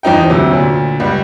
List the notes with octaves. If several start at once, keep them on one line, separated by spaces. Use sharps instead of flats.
E2 F3 D#4 G5
D2 C3 F#3
D2 A#2
C#2 G3